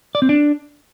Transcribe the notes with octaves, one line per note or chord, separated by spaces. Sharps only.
D5
C4
D4